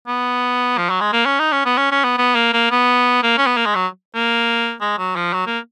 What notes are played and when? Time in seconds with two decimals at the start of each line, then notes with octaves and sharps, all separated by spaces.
0.07 B3
0.78 F3
0.90 F#3
1.01 G#3
1.13 A#3
1.25 C#4
1.39 D#4
1.52 C#4
1.65 B3
1.78 C#4
1.91 C#4
2.04 B3
2.18 B3
2.35 A#3
2.53 A#3
2.71 B3
3.23 A#3
3.38 C#4
3.47 B3
3.57 A#3
3.66 G#3
3.75 F#3
4.15 A#3
4.81 G#3
4.98 F#3
5.16 F3
5.33 F#3
5.47 A#3